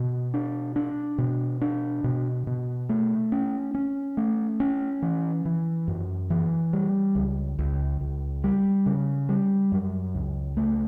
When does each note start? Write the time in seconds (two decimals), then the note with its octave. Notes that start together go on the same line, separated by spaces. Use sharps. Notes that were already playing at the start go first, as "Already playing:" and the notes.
Already playing: B2
0.34 D4
0.76 D4
1.18 B2
1.61 D4
2.04 B2
2.47 B2
2.89 A3
3.32 C#4
3.75 C#4
4.17 A3
4.60 C#4
5.02 E3
5.45 E3
5.88 F#2
6.30 E3
6.73 G3
7.15 C#2
7.59 C#2
8.01 C#2
8.44 G3
8.86 C#3
9.29 G3
9.72 F#2
10.15 C#2
10.57 A3